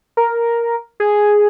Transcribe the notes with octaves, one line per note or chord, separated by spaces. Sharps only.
A#4
G#4